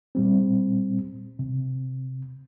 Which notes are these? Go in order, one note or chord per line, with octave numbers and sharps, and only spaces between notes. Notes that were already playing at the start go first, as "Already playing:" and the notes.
A#2 G3 C4
C3